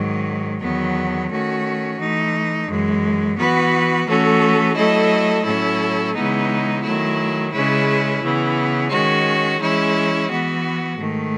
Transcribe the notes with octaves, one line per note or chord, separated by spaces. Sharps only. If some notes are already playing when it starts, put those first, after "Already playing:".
Already playing: G#2 D#3 F#3
E2 D#3 F#3 B3
D#3 A3 C#4 F#4
E3 A3 D#4
F#2 E3 G#3
E3 B3 F#4 B4
E3 A3 C#4 F#4 A4
F#3 A3 E4 A4 D#5
A2 F#3 C#4 E4 A4
C#3 E3 G#3 B3 D#4
D#3 F#3 A3 E4
C#3 G#3 C#4 E4 B4
C#3 E3 B3
D#3 G#3 C#4 F#4
E3 G#3 C#4 E4
E3 B3 F#4
G#2 D#3 A3